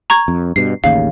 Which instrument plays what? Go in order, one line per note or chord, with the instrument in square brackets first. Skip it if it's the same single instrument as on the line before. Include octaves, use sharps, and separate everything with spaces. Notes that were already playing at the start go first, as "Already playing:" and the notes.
[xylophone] A#5 C#6 G#6
[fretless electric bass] F2
[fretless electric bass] G2 B2 [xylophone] C7
[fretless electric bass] A1 D#2 C#3 [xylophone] F5